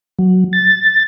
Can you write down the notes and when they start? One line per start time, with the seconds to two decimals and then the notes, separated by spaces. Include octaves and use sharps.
0.19 F#3
0.53 A6